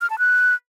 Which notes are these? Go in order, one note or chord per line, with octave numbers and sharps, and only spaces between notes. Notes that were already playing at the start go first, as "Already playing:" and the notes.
F6
A5
F#6